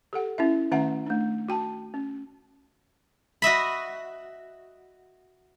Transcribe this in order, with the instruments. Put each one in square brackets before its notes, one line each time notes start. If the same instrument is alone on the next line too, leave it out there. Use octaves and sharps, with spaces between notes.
[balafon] G4 A4 F#5
C#4 E4 E5
D#3 A3 C#4 E5 F#5 A#5
A3 D4
F#4 G5 A5
C#4
[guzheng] F#4 D#5 E5 B5